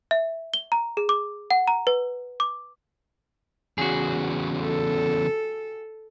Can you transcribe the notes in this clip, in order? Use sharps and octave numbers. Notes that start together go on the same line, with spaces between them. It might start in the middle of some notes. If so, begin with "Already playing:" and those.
E5
G7
A#5
G#4
D6
F#5
A#5
B4
D6
E2 C#3 F#4 G#4
A4